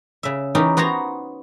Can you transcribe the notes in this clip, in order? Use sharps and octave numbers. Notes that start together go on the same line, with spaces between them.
C#3 E5
E3 C#4 D#4 G4
B3 F#4 C5 C#5 A#5